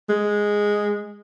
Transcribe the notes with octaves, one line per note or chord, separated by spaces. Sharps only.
G#3